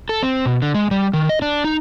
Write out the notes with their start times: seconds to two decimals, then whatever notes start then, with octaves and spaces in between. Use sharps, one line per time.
0.09 A4
0.23 C4
0.46 B2
0.62 D3
0.74 G#3
0.91 G3
1.13 D#3
1.29 D#5
1.42 D4
1.64 D#4